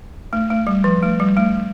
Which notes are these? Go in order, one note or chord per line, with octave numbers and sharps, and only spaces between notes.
A3
A3
G3
F3
A3
G3
A3